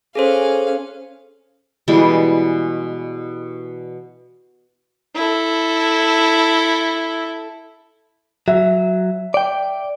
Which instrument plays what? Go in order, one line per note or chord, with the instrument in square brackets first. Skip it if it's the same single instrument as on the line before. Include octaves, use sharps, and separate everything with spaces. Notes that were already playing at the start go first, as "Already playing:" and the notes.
[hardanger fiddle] C#4 F5 [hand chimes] G#4 A4 C5
[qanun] B2 E3 G3 G#3
[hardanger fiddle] E4 A4
[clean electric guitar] F#3 [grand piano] E5
[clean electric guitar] D5 G5